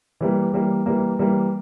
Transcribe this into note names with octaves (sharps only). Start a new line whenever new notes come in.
E3 G3 A#3
E3 G3 A#3
E3 G3 A#3
E3 G3 A#3